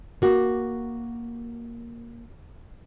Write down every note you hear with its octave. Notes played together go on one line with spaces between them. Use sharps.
A#3 F#4